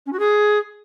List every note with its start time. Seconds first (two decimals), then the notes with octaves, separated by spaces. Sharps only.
0.06 C#4
0.13 F#4
0.19 G#4